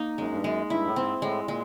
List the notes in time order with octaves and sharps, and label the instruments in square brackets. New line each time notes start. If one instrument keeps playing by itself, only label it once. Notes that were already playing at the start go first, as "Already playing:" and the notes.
Already playing: [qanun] A#3 D#4
[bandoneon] F#2 [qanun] G#3
[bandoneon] G2
[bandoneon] F#2 [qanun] G#3
[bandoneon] G2 [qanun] E4
[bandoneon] A2
[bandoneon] G#2 [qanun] C4
[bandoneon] A2 [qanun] G#3
[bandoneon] A#2 [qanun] G#3